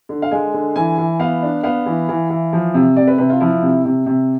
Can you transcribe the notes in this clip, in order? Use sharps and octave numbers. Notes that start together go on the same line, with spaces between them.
D3
F5
G#3 G#5
D3
E3 G#5
E3
B3 F5
D4
B3 F5
E3
E3
E3
F3
C3
C3 D5
B4
C3 B4
F4
F3 E4
C3
C3
C3